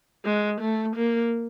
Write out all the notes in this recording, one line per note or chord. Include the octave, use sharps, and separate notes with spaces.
G#3
A3
A#3